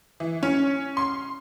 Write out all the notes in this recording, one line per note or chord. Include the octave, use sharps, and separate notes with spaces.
E3
C#4
C6